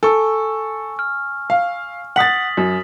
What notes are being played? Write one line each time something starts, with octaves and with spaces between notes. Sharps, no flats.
A4 G#5 C#6 E6
F6
F5
F#5 D#6 A6 B6 F#7
F#2